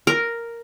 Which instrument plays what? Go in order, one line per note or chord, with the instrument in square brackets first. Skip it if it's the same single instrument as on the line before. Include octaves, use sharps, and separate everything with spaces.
[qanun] A#4